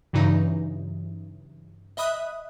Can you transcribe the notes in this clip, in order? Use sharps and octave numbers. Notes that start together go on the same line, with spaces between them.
G2 C#3 E3 F#3 D#4
D#5 E5 B5 D#6 F#6